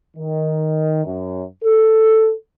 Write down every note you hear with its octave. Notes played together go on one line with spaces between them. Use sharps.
D#3
F#2
A4